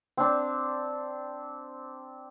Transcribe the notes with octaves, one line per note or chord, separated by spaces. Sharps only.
C4 D4